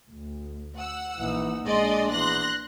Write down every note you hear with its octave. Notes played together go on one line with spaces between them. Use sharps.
D2
F#5 E6
A#1 E3 D#4
A#1 G#3 D4 D5 D#5 C6
E2 C6 F#6 A#6